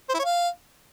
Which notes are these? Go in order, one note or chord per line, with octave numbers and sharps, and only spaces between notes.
C5
E4
C#5
F5